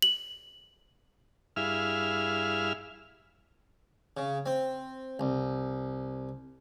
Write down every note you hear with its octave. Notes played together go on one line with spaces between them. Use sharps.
F#7
G2 E4 G#4 E5 F5 F6
C#3
C4
C2